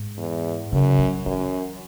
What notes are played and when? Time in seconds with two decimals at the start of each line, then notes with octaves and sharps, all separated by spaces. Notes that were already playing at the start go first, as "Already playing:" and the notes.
Already playing: G#2
0.17 E2
0.72 F#2 C#3
0.99 F#3
1.26 F#2 E3